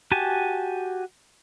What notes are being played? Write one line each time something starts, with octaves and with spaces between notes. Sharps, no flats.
F#4 G4 G#5 A5